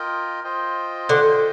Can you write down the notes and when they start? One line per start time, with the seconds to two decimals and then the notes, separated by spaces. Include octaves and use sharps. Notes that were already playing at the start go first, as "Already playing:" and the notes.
Already playing: F4 A#4 D#5 G5
0.44 F4 C5 D#5 G5
1.09 D3